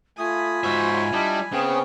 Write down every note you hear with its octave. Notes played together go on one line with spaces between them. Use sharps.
A3 F4 G#5 B5 D#6
G#2 F#4 C5 E5 C6
G3 D4 E4 D#5
C#3 B3 C4 G#4 C5